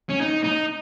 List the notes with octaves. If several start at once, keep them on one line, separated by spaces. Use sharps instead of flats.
C#4
D#4
D#4